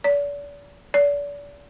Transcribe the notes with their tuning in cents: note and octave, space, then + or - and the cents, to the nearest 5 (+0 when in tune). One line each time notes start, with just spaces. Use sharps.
D5 -40
D5 -35